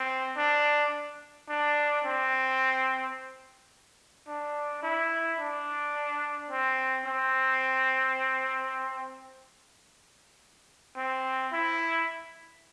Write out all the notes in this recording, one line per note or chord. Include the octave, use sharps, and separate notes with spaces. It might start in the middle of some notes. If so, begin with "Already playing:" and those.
Already playing: C4
D4
D4
C4
D4
E4
D4
C4
C4
C4
E4